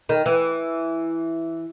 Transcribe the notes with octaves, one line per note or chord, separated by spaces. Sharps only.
D#3
E3